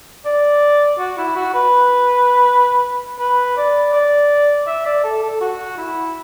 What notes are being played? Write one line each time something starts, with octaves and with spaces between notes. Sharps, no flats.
D5
F#4
E4
F#4
B4
B4
D5
D5
E5
D5
A4
A4
F#4
E4